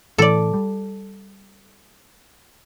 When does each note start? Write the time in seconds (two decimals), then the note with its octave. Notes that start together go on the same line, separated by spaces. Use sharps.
0.18 A2 E3 A4 D5
0.54 G3